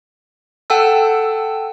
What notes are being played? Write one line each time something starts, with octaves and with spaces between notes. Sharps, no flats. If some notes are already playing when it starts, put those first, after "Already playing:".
A4 F#5 G5 A5 E6